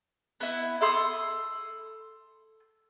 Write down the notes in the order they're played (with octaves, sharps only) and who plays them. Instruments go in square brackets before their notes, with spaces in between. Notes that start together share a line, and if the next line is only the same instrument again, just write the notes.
[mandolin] B3 E4
A4 B5 C6 D#6